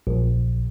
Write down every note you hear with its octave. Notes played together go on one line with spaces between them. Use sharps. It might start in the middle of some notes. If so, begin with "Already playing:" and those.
A#1